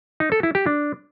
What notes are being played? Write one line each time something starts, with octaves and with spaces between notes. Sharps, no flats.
D#4
A4
E4
G4
D4